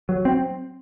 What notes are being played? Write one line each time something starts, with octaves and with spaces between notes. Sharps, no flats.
F#3
C4